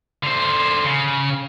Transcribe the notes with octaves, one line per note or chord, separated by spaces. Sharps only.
D3 C5
C#3